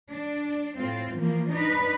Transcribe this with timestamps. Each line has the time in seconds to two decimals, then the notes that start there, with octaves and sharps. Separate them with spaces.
0.11 D4
0.77 A2 C4 F4
1.15 E3 F3 A#3
1.51 D4 D#4 B4